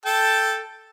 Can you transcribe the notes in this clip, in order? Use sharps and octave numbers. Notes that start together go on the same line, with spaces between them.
A4 G5 A5